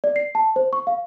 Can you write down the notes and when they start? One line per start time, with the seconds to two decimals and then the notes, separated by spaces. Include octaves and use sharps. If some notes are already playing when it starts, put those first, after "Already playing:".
0.04 D5
0.16 C7
0.35 A5
0.56 C5
0.73 C#6
0.87 F5